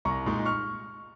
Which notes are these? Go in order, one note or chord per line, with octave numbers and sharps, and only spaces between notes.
C2 A#5 C#6
A#2 G#3 D#4
C#6 F6